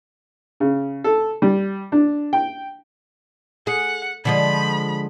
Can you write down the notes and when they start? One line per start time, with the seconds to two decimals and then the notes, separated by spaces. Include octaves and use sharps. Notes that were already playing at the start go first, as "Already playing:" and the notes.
0.60 C#3
1.04 A4
1.42 G3
1.92 D4
2.33 G5
3.67 G#4 F#5
4.25 D3 F3 G#3 B5